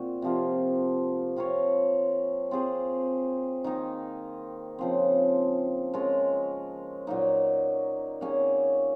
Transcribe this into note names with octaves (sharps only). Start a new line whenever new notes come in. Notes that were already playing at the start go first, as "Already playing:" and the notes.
Already playing: A#2 C4 F#4
C3 F3 A#3 F4
C4 F4 A#4 C#5
C4 F4 G#4 C5
D#3 A#3 D#4
C#3 F3 C4
G#3 C#4 F4 A#4
A#2 F#3 A#3 D#4
D#3 A#3 C#4 G#4